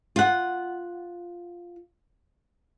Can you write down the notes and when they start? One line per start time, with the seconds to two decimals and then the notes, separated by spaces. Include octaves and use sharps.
0.16 F4 F#5